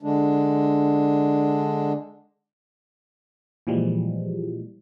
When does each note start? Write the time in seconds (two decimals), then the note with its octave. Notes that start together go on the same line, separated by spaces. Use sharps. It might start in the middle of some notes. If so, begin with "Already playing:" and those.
0.03 D3 G#3 D4
3.67 A#2 E3 F3 G3 G#3